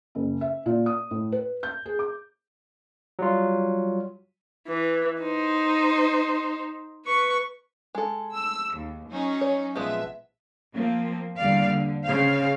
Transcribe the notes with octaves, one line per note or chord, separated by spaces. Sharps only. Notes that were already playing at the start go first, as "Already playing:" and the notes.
F#1
E5
A#2
D#6
A2
B4
G6
G#4
D6
F#3 G3 F4
E3
D#4 C5
B4 C#6
G#3 A4
E6
D#2
F#3 C#4 D#4
C#5
A#1 F3 G#3 B3 E5
F3 A#3 C4
E2 D3 G3 A#3 D5 F5
D3
C#3 C5 F5